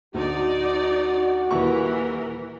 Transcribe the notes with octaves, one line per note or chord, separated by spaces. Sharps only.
D2 D#4 F#4 D5
D#1 E3 E4 A#4 C#6